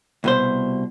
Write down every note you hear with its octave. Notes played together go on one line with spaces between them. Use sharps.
C2 B2 C5